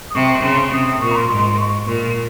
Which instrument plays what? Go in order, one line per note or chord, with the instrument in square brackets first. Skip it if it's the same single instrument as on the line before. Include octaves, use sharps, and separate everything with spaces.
[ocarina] D#6
[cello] C3 [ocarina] C#6
[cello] C#3 [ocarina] C6
[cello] C3 [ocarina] D#6
[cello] A#2 [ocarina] C#6
[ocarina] A#5
C6
[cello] G#2 [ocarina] C6
[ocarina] C6
C#6
[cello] A#2